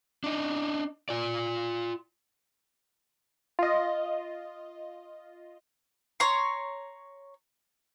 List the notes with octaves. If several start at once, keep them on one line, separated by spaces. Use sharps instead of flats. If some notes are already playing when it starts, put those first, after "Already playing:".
D4 D#4
F4 D5
F4 D#5
C#5 A#5 C6